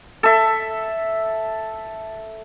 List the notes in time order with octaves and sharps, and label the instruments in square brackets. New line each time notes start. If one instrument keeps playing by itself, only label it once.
[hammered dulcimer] A4 E5